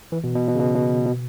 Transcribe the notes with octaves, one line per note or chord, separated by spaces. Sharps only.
E3
B2
B2
B2
C#3
B2
B2
B2